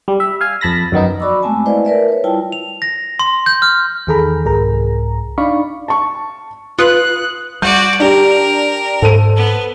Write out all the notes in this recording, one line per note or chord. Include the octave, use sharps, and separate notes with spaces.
G3
E5
F5 G#5 F6
F2 A5 B5 A#6
F#2 D#3 B3 D#4
F#4 D5 B5 C#6 D6 E6
G#3 A3 B3 C4 G#5 A5
E4 B4 C5 D5 D#5 F5
A#4 B4 D5 E5
B4 C#5
G3 E4 F4 G5 A5
F7
A#6
C6
G6
F6
E2 D#3 G#4 A4 A#5 B5
C2 G#2 G#4 A#4 A#5
D4 D#4 D5 F5 B5 C#6
A5 C#6
F4 B4 D#6 F#6 C7 C#7
G3 F#4 D5 G6
D4 G4 A#4
G#2 A4 C5 D#7
B3